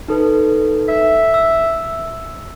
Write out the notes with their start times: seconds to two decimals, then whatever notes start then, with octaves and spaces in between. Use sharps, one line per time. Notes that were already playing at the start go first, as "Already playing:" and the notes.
0.08 D#4 A4 B4
0.89 E5
1.34 E6